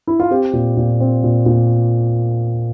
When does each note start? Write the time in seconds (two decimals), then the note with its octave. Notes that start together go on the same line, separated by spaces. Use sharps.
0.07 E4
0.20 F4
0.31 C4 G4
0.53 A#2
0.77 A#2
1.00 C4
1.24 A#2
1.46 A#2